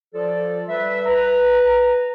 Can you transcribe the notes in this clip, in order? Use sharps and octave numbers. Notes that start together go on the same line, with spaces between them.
F3 F4 A4 D5
G3 B4 E5
B4 A#5